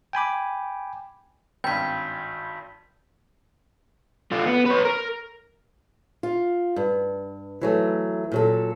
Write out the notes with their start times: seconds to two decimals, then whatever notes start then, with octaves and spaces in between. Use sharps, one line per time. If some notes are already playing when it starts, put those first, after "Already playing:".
0.13 G5 G#5 B5 D6
1.64 G#1 G2 G5 G6 B6
4.31 A3 F4
4.46 B3
4.66 B4 C#5
4.85 A#4
6.23 F4
6.76 G2
7.61 E3 F#3 A3
8.32 A#2 F#3 A4